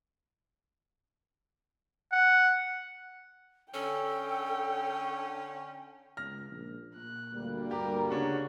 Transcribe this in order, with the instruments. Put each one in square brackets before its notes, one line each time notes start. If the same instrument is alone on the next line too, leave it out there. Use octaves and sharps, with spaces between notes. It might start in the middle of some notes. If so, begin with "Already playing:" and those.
[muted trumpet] F#5
[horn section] D3 C#4 [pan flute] A4 [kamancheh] G5
[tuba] C#2 [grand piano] F6 A#6
[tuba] A#1
[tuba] A#2 [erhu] F#6
[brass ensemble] D2 G3 A#3
[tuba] G2 [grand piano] G4 [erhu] A#4
[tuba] C#3 [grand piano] C#4 D4 F#5 [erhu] F#4